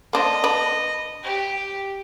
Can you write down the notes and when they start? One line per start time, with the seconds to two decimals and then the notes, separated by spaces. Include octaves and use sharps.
0.13 A#3 D4 C5 D#5
0.44 D4 B4
1.23 G4